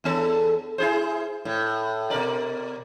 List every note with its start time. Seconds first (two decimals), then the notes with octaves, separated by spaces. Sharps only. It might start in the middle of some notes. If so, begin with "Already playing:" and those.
0.04 E2 B3 A4
0.78 E4 G#4 C5
1.45 A2
2.10 B2 A#4 D5